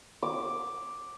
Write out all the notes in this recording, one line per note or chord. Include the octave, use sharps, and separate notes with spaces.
D6